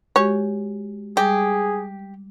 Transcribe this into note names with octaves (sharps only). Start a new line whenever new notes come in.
G#3 F#4 G4 C#5
G3 G4 G#4